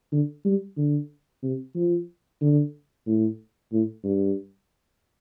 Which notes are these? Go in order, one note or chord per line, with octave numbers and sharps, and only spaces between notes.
D3
G3
D3
C3
F3
D3
A2
A2
G2